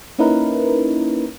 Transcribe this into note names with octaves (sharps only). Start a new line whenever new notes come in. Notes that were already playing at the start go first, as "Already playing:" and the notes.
A#3 C#4 D#4 E4 A#4 B4